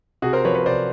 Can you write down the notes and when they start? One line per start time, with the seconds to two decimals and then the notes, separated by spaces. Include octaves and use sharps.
0.22 C3 F#4 G#4
0.33 A#4 C5
0.44 F3 B4 C#5
0.55 B4 C#5
0.66 C3 C5 D5